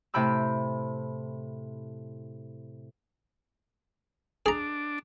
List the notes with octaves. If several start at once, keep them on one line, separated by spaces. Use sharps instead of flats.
A2 C3 G5 B5 E6
D4 G#4 A#5